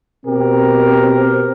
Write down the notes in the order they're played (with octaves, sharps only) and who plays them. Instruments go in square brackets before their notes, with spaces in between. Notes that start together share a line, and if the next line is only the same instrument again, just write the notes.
[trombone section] B2 G4 A#4 [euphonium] C4